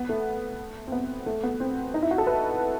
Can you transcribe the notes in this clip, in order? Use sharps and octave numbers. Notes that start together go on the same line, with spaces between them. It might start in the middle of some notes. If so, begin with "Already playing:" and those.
Already playing: B3
A3
C4
B3
A3
B3
C4
D#4
E4
F#4
A4
B4